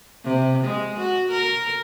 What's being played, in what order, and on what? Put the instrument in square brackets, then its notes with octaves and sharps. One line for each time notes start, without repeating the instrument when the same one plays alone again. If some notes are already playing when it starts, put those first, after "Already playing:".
[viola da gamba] C3
G#3
F#4
A#4